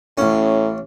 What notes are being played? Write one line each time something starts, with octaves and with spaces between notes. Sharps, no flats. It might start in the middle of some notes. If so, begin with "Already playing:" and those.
A1 A2 C#4